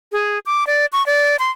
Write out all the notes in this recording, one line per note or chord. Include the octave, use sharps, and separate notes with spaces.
G#4
D6
D5
C#6
D5
C6